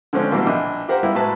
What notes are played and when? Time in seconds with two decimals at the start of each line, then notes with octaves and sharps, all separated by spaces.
0.13 D3 F3 G#3 C4 C#4
0.32 B2 E3 G3 A#3 B3 D4
0.46 A#1 D#5 E5
0.88 F4 G4 A#4 C5 F#5 A#5
1.03 G3 B3 E4 F4
1.15 A2 G#3 F#4 B4 A5 A#5